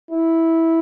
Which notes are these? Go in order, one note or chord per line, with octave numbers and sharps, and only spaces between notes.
E4